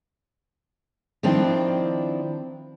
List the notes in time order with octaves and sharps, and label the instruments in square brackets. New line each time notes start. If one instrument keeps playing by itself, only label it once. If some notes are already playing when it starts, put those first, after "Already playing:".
[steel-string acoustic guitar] D#3 F3 C4 D4 E4